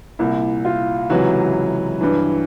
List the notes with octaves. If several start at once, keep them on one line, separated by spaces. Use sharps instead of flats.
C2 A#2 E4
F4
C#2 C3 E3 F#3 F#4
G2 E3